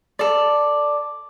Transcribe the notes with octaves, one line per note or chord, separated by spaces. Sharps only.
A4 D5